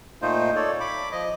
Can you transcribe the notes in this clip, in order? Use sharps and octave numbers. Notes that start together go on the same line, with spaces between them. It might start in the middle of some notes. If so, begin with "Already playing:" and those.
A#2 A3 D#4 F4 C5
A4 C#5 D5
B5 D6
F3 D#5